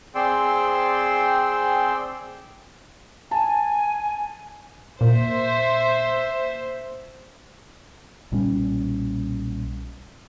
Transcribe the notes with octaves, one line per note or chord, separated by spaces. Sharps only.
C4 G#4 D5 G5 C6 E6
G#5 A5
A#2 C5 E5
B1 A#2 G3 C#4